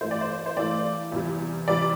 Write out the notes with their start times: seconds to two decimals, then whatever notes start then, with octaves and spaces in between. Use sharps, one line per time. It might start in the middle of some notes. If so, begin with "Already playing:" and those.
0.01 G2 E3 A3 C5
0.11 D5
0.21 C5
0.46 C5
0.57 G2 E3 A3 D5
1.12 E2 C3 G3
1.68 E2 C3 G3 D5